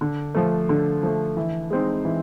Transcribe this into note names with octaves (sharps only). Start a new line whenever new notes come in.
D3
F3 A3
D3
F3 A3
E3
G#3 C4 D#4
E3